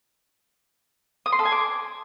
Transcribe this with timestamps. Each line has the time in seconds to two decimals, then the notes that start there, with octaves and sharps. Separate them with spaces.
1.26 D#6
1.32 C6
1.39 A4
1.45 G#5
1.52 D6